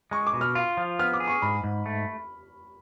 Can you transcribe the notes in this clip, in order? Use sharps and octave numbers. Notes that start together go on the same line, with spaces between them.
G#3 C#6
D6
B2
F6
F4
F3
B3 F6
D6
G#4
C#6
G#2 B5
G#2
A3